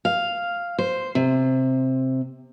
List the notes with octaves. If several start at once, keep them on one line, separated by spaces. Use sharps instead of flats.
F5
C5
C3